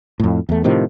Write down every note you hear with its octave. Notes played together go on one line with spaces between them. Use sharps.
F2 A2
E2 A3
A2 C3 D#3 F3